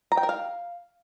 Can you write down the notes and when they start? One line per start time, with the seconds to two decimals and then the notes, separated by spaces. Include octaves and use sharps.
0.12 A#5
0.17 G5
0.23 A#4
0.29 F5